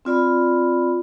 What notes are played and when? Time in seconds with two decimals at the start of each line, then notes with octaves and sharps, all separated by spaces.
0.05 C4 F4 D5 B5